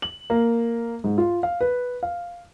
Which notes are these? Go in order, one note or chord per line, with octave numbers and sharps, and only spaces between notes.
F#7
A#3
G#2
F4
F5
B4
F5